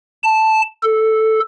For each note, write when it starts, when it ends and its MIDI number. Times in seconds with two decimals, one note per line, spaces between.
0.23 0.61 81
0.83 1.39 69